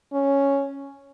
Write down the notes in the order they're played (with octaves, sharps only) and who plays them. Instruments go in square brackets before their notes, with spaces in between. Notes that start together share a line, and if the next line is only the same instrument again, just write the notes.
[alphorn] C#4